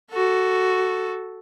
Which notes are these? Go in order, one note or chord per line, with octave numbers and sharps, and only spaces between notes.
F#4 A4